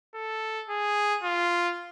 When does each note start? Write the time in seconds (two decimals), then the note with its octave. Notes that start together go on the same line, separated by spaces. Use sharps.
0.14 A4
0.69 G#4
1.23 F4